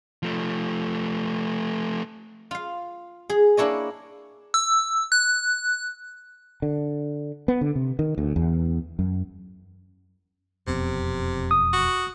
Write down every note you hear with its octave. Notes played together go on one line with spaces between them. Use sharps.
F3 A3
F4 F5
G#4
A#3 D4 E4 C#5 D#5
E6
F#6
D3
B3
D3
C3
D#3
D2
E2
F#2
E1 F2 C3 B3
D#6
F#4